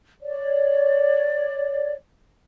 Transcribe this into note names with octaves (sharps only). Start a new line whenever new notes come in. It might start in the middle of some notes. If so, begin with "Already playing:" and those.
C#5 D5